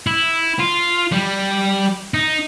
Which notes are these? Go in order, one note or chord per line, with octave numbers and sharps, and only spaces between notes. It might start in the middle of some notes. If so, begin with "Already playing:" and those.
E4
F4
G3
D#4